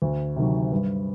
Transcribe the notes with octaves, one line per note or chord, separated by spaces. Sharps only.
D2
C3 D#3 F#3
G2